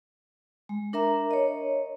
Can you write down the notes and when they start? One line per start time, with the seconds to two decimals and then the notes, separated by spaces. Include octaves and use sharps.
0.69 G#3
0.93 D4 A#4 E5 A#5
1.31 C#5 D#5